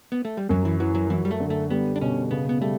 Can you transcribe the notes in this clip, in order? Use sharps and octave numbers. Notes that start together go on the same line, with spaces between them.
B3
A3
G3
F#2 F#3
E3
E3 F#3
F#3
E3 F#3
G3
A3
D3
A3
G3 B3
D4
B2 C#4
C#3 B3
B3
G3 A3